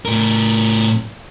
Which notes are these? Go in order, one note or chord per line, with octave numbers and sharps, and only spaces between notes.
A2 A#4